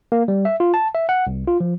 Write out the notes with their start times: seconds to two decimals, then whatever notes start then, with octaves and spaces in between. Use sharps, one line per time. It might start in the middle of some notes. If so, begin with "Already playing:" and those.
0.12 A#3
0.28 G3
0.45 E5
0.60 F4
0.74 A5
0.94 E5
1.09 F#5
1.27 C2
1.48 F4
1.60 F3